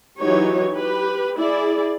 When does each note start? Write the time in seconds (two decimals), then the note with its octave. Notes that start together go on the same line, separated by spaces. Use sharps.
0.18 E3 F#3 D#4 G4 C#5
0.69 G4 B4
1.36 E4 G#4 D5